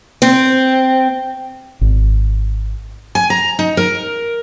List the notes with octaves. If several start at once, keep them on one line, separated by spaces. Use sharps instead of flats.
C4
G#1
G#5
A#5
D#4
A#4